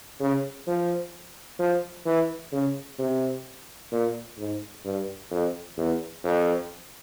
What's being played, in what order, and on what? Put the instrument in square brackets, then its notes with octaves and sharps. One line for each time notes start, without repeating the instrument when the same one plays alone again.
[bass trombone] C#3
F3
F3
E3
C#3
C3
A#2
G#2
G2
F2
E2
F2